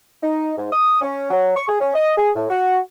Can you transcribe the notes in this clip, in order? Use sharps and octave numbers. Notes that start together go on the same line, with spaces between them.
D#4
G#2
D#6
C#4
F#3
C#6
G#4
C#4
D#5
G#4
A2
F#4